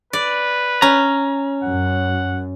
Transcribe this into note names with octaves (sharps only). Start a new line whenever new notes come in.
B4 D5
C#4 A#5
F#2 F#5